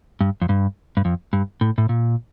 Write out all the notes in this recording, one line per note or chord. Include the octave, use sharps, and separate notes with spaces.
G2
F2
G2
G2
F2
G2
A2
A2
A#2